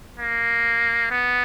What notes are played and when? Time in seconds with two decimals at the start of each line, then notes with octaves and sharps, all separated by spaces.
0.20 A#3
1.11 B3